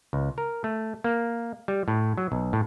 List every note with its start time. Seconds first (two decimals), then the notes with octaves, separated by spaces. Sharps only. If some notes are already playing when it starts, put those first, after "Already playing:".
0.13 C#2
0.38 A#4
0.64 A3
1.04 A#3
1.68 G3
1.88 A2
2.17 F#3
2.32 B1
2.53 A2